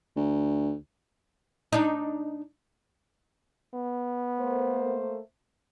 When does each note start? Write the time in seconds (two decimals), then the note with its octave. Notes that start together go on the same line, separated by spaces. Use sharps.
0.16 D2
1.73 D4 D#4
3.73 B3
4.39 A3 A#3 C5